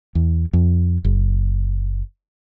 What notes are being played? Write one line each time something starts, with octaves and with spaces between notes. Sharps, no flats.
E2
F2
F#1